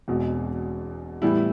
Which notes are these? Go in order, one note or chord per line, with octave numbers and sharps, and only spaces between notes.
E1 E2 B2 G#3 C4
A2 E3 G3 B3 E4